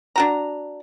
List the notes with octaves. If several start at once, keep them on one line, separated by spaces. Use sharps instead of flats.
D4 F#4 A#5